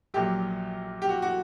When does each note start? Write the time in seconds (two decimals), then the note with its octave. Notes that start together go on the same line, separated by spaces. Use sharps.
0.14 A#1 A#2 F#3 G4
1.02 G4
1.09 F#4
1.22 F#4